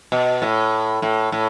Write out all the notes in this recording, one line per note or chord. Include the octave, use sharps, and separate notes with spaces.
B2
A2
A2
A2